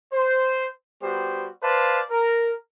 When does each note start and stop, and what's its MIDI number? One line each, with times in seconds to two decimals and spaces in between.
0.12 0.66 72
1.03 1.48 55
1.03 1.48 59
1.03 1.48 66
1.03 1.48 67
1.03 1.48 72
1.63 2.01 71
1.63 2.01 72
1.63 2.01 74
1.63 2.01 77
1.63 2.01 81
2.10 2.54 70